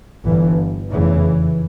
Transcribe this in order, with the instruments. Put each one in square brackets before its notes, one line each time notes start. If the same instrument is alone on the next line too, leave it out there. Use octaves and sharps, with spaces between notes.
[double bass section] G1 G2 E3
F1 E2 C#3 E3